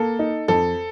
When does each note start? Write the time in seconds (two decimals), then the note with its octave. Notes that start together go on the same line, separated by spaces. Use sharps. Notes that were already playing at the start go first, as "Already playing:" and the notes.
Already playing: A#3 A4
0.19 D#4
0.48 F2 A4